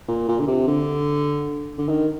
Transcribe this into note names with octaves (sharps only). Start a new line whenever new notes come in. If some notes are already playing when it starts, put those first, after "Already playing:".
A#2
A#2
D3
C3
D3
D3
D#3